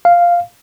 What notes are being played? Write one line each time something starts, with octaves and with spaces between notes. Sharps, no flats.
F5